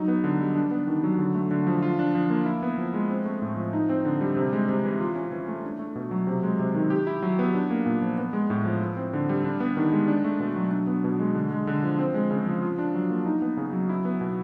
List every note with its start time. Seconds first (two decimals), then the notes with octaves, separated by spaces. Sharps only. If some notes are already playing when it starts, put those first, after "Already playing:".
Already playing: F#3 D#4
0.08 B3
0.24 D3
0.40 G3
0.55 D4
0.71 B3
0.87 D#3
1.03 F#3
1.19 D3
1.35 A3
1.51 D3
1.67 F3
1.82 F4
1.99 D4
2.15 F3
2.30 A#3
2.46 E4
2.63 B3
2.78 F3
2.94 G#3
3.10 C4
3.26 A3
3.42 A2
3.57 F3
3.73 D#4
3.89 C4
4.05 D3
4.21 G3
4.36 C3
4.53 G#3
4.69 C3
4.84 E3
5.00 F4
5.15 C#4
5.32 E3
5.48 A3
5.64 D4
5.79 A3
5.96 B2
6.11 F#3
6.27 C3
6.43 G#3
6.59 C3
6.75 D#3
6.90 G4
7.07 E4
7.22 F#3
7.39 B3
7.54 D4
7.70 A#3
7.86 A#2
8.02 F3
8.18 B3
8.33 G#3
8.50 A2
8.65 F3
8.81 E4
8.97 C4
9.13 D3
9.29 G3
9.44 D4
9.60 B3
9.77 D#3
9.92 G#3
10.08 D4
10.24 A3
10.40 B2
10.56 F#3
10.71 D4
10.87 B3
11.04 B2
11.19 G#3
11.35 D3
11.51 G#3
11.67 D3
11.82 F3
11.99 C4
12.14 G#3
12.31 C#3
12.46 F3
12.62 F4
12.78 D4
12.94 F#3
13.10 A#3
13.25 D#4
13.42 B3
13.57 C#3
13.73 F#3
13.89 E4
14.05 B3
14.21 B2